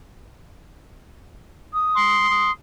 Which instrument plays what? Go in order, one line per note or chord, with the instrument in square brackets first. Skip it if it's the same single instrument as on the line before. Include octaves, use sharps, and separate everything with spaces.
[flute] D#6
[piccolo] C6
[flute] D#6